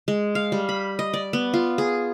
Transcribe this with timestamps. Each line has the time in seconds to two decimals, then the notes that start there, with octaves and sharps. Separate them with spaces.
0.08 G#3
0.35 F5
0.52 G3
0.69 B5
0.99 D#5
1.14 D5
1.33 B3
1.54 F4
1.78 G#4